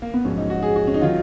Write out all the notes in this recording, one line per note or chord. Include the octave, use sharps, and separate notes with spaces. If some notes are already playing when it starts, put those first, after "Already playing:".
A#3
B3
A#1 G#2 F#3 C#4
D#4
F#4
G#4
F#4
C#4
D#4
D#3 F#3 F4